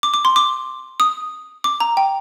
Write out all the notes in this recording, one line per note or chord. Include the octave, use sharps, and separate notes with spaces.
D6
D6
C6
D6
D#6
D6
A#5
G5